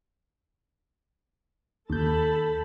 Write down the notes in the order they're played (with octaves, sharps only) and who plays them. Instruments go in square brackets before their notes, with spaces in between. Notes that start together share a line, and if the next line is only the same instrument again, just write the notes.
[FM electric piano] D#2 G6 [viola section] A4 A5 B5